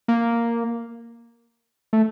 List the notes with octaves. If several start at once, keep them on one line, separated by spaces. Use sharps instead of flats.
A#3
A3